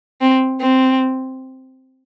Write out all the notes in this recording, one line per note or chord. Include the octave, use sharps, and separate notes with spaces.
C4
C4